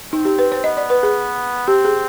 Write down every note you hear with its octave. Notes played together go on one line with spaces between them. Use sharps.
C4 D#4
G4
B4
C5
B3 D#5
D5
B4
G#4
C4 G4
G#4